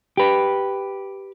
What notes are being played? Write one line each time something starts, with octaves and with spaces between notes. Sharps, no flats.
G4 B4